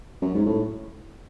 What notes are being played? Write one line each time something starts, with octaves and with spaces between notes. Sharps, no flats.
F#2
G#2
A2